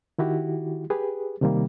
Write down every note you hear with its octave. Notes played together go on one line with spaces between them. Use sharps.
D#3 E4 F#4 G4
G4 G#4 B4
C3 D#3 G3 A#3